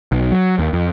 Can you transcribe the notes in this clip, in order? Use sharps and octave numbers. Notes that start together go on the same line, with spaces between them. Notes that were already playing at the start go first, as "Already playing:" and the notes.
B1
F#3
D#2
F2